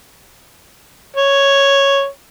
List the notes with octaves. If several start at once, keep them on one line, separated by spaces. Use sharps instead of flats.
C#5